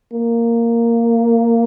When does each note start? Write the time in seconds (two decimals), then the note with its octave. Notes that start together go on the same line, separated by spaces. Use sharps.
0.13 A#3